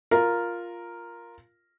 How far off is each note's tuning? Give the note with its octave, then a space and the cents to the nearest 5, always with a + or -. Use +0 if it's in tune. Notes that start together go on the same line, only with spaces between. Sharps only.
F4 +0 A#4 +0